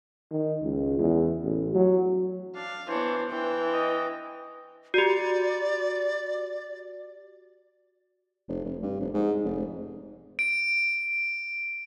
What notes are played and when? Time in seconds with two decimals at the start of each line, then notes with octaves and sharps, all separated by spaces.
0.31 D#3
0.63 C#2
0.99 E2
1.44 A1
1.75 F#3
2.56 D4 F5
2.88 E3 B3 D4 C5 C#5
3.30 E3 G5
3.73 D#5
4.94 F#4 G4 D5
8.48 F1
8.65 F1
8.82 G2
9.00 F1
9.14 G#2
9.44 F1
10.39 D7